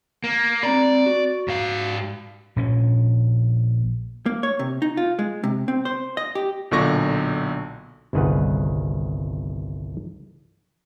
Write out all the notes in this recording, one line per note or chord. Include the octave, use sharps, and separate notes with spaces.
A#3
C4 D5 A#5 B5
F#4
G#2 F5
A#1 A#2 C#4
A#3
C#5
C3
D#4
F4
G#3
C3
C4
C5
D#5
G4
B1 A#2 D3 C#6 A#6
G1 C2 D#3 G#4 B4 F#5